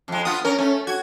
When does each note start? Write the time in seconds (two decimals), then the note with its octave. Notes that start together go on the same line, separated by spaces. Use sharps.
0.08 F2 G#3
0.25 B3 F4 D#6
0.45 C#4 A#4
0.59 A3 C#4
0.87 F#4 G#6